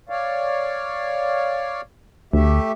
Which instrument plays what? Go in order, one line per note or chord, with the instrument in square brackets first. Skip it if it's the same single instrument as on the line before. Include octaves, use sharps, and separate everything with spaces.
[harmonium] C#5 D5 F5
[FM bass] D2 [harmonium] A3 G4 E5